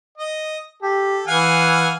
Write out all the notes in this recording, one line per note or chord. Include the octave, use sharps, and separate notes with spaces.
D#5
G4 A4
E3 F5 F#5 G#5